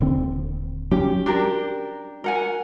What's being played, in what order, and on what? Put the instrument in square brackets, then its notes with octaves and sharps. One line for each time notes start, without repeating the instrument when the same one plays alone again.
[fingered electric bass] D#1 D3 C4
[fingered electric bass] F#3 C#4 [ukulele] G4
[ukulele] D4 G4 A#4
A#4 F#5 G#5